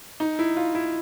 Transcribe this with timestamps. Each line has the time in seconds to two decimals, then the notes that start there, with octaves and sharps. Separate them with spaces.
0.20 D#4
0.39 E4
0.57 F4
0.75 E4